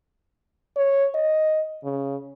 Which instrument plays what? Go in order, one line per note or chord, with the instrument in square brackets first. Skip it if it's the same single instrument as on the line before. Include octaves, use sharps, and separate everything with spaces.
[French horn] C#5
D#5
C#3